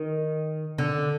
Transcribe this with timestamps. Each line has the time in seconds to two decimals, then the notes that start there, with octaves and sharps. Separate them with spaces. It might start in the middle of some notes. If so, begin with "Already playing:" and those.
Already playing: D#3
0.78 D3